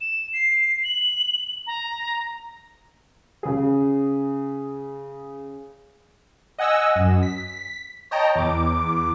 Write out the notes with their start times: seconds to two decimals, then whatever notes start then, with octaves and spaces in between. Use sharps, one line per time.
0.01 E7
0.33 C7
0.84 F#7
1.67 A#5
3.43 C#3 G#4
6.58 D#5 F#5 G#5 E6 A#6
6.96 F#2
7.23 B6
8.11 C#5 D#5 G5 A5 A#5
8.35 E2 D6